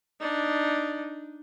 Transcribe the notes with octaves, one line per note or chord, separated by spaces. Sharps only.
D4 D#4